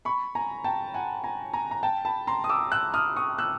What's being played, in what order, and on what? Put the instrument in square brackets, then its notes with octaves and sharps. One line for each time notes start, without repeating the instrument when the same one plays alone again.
[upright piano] B5 C#6
G#5 A#5
G5 A5
F#5 G#5
G#5 A#5
G#5 A#5
A#5
G5 A5
A5 B5
A#5 C6
D#6
D6 E6
E6 F#6
D#6 F6
C#6 D#6
E6 F#6